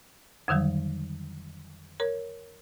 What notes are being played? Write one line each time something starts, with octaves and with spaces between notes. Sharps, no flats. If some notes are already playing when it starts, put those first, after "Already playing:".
F2 D3 D#3 F#3 G3
A#4 C#5